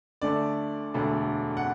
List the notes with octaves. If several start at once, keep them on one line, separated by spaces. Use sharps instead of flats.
D2 D3 A3 D5
E1 D2 D3 A3
F#5